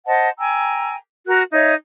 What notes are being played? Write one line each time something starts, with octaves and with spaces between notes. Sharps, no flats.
C5 D#5 F#5 A5
G5 G#5 A#5 E6
F#4 A#4 F#6
D#4 C#5 D#5 E5